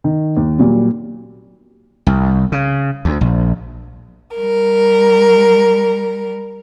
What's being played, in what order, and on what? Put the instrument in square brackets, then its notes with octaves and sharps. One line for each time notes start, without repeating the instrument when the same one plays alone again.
[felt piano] D#3
D#2
A#2 F#3 G3
[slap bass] C2
C#3
D2
A#1
[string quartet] G3 A#4